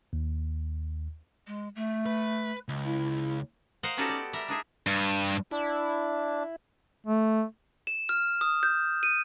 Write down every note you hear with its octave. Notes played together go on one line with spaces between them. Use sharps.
D#2
G#3
A3
B4
C#2
E4
A#4 C5 D#5 F5 F#5
B3 C#4 D#4 F#4 G4 A4
D5
G3 A#4 E5
D4 D#4 G#4 E5
G2
D4 E4
A3
E7
F6
D#6
G6
D#7